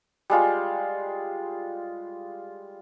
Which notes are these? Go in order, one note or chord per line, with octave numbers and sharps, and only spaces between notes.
G3 G#3 F4